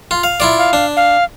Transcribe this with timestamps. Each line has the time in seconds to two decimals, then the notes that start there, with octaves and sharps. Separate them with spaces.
0.11 F4
0.23 F5
0.40 E4 F4 D5
0.59 F5
0.73 D4
0.97 F5